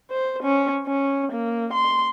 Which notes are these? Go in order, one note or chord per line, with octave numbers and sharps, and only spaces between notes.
C5
C#4
C#4
A#3
C6